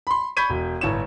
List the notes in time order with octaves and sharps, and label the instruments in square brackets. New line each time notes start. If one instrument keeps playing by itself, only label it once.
[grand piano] B5 C6
B5 C#6 G6 G#6 B6 D#7
E1
G1 A2 C#5 E7